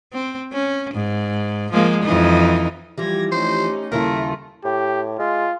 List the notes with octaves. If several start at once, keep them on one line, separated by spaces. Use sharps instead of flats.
C4
C#4
G#2
F3 G#3 A#3
F2 E3 D#4
E3 F3 G3 G4 G#6 A#6
A3 C#4 D#4 C5
D#2 C#3 G3 A3 E4 F4 A#4 E5
A2 G4
G#3 F4